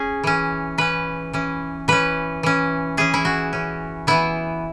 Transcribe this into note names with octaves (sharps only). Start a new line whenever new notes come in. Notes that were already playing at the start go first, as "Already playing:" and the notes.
Already playing: C#4 G#4
E3 C#4
E3 C#4 B4
E3 C#4
E3 C#4 B4
E3 C#4
E3 C#4 G#4
E4
F#4
E3 C#4
E3 B3 E4